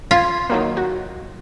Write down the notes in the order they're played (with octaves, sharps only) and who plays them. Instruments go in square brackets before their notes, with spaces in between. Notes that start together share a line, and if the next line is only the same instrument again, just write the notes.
[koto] F4 [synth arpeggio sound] G#6
[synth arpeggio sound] D#3 F#3 A#3
F#4